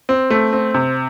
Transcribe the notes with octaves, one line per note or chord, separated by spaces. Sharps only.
C4
A3
C4
C3